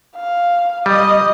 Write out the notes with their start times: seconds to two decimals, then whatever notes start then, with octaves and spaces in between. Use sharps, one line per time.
0.16 F5
0.86 G3 D#5 D#6